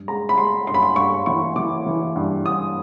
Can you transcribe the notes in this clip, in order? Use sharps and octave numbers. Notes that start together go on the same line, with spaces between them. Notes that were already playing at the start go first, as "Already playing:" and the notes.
Already playing: G2
G#3 A#5
B5
G#3 C6
G2 C6
B5
C6
G2 C#6
E3 C#6
E3 D6
E3
G2
G2 D#6